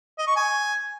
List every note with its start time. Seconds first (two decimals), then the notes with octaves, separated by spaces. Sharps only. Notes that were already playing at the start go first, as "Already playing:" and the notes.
0.18 D#5
0.27 C#6
0.36 G#5